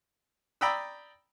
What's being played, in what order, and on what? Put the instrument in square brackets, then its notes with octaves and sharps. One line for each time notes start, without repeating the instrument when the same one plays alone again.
[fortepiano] D5 G5 A#5 B5 D#6 E6